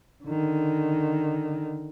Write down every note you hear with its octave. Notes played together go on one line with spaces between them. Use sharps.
D3 D#3